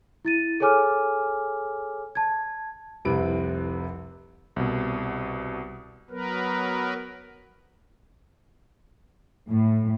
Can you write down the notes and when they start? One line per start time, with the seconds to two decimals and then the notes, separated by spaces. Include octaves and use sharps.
0.25 E4 A6 D#7
0.60 G#4 A4 C#5 G#5 D6 F6
2.15 A5 G#6
3.05 F1 C2 C3 E4 B4 D7
4.56 C2 B2
6.10 F#3 B3 A#4 B4
9.49 A2